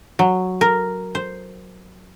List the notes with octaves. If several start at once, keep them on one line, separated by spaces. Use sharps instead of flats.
F#3
A#4
C5